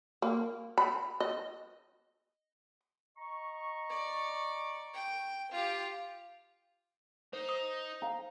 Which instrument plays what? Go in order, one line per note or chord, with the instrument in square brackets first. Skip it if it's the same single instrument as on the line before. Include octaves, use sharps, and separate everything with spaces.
[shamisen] A#3
B5
D#5
[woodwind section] D#5 A#5 C#6
[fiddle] D5
G5
F4 G4
[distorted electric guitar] D#4 [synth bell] C5
[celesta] D#6
[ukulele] F5 A#5